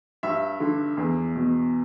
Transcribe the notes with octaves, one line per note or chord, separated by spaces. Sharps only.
G2 E5
D3
E2
B2